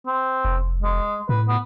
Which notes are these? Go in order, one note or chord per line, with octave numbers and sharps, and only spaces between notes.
C4
F1
G#3
A2 B4
B3